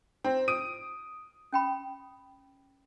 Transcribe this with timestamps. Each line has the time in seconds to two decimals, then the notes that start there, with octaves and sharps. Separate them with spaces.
0.24 C4 F4
0.48 D#6 D7 D#7
1.52 C#4 G5 B5